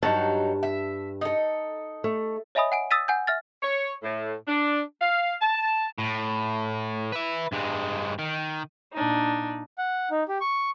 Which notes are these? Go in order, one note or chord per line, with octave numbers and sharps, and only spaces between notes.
G2 F#3 D#4 A5
E5
D#4 A4
A3
C#5 D#5 E5 G#5 B5 D#6
F#5 G#5 D7
D#6 E6 A6 B6 D#7
F#5 G#5 G6
E5 F6 A6
C#5
A2
D4
F5
A5
A2
B4 E5
G2 G#3
D#3
A#2 D4 D#4
F#5
D#4
G4
C#6